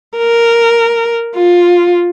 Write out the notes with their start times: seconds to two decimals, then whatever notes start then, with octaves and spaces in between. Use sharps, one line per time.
0.18 A#4
1.36 F4